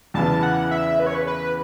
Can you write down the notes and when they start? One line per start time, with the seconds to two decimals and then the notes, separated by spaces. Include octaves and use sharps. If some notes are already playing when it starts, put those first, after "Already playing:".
0.14 E2 C#3 E3 A5
0.43 F#5
0.71 E5
1.00 B4
1.06 C#5
1.15 B4
1.27 B4